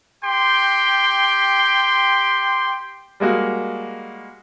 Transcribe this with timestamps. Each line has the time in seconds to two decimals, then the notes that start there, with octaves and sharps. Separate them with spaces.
0.24 G4 G5 C6
3.20 G3 G#3 A#3 F#4